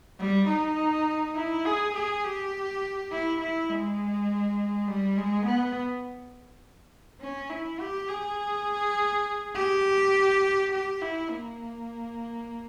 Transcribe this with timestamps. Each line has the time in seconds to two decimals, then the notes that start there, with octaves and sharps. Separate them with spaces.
0.20 G3
0.49 D#4
1.36 E4
1.65 G#4
1.95 G#4
2.25 G4
3.12 E4
3.41 E4
3.70 G#3
4.88 G3
5.17 G#3
5.46 B3
7.21 C#4
7.50 E4
7.81 G4
8.09 G#4
9.55 G4
10.73 G4
11.02 E4
11.30 A#3